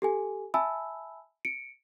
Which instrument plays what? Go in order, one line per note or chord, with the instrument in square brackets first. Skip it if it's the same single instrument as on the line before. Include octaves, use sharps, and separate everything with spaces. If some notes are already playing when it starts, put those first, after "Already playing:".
[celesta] G4 A4 G#5
E5 G#5 A5 B5 E6
C#7 D7